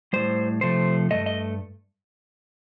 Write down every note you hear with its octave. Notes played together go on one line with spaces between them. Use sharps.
A2 G3 C5
C3 F3 A3 C5
G2 F3 A3 D#5
D#5